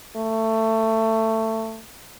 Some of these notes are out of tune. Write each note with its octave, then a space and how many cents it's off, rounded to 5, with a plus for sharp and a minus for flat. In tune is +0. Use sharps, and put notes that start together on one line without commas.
A3 +20